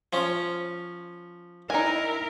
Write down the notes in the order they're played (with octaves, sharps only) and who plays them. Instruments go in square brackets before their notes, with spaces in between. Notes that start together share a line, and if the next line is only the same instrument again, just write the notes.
[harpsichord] F3 C#4
[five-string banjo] D#4 G#5 [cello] E4 A#4